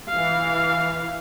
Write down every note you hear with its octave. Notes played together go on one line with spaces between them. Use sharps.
E3 F5